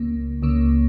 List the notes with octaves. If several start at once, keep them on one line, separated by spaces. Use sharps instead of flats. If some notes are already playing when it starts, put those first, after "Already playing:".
Already playing: C#2 C#3 A#3
C#2 C#3 A#3